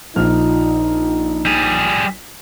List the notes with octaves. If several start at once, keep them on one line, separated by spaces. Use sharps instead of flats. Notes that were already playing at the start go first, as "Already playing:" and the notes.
A#1 F3 D#4 F6
G3 G#4